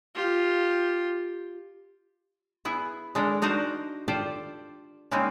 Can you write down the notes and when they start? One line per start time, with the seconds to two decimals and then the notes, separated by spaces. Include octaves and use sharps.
0.15 F4 G4
2.65 B3 E4 G#4
3.15 G#3 D4 A4 A#4
3.42 D4 D#4 F#4 A#4 C5
4.08 F4 G4 A4 C5 D5
5.11 C#3 G#3 A#3 C4 C#4 D#4